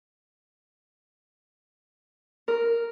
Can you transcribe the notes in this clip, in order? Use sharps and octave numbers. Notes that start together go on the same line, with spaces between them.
A#4